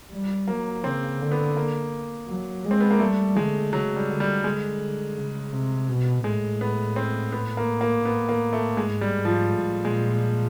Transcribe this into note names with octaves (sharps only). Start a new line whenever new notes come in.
G3
F#3 A#3
C#3 C4
D3
B3
A#3
F#3
G#3
C4
B3
A#3
G3 A3
D3 G#3
C#3 F#3
G3
D3
G3
D3 G#3
C#3
C3
B2
A2 G#3
B3
C4
B3
A#3
A#3
A2 B3
A#3
A3
G#2 G#3
G3
G#2
F3
A2
A#2 G#3